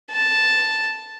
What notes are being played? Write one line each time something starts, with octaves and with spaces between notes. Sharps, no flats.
A5